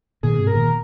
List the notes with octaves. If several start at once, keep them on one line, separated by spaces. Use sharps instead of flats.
A#2 D#3 G#4
G#2 C3
A#4
A#2 D#3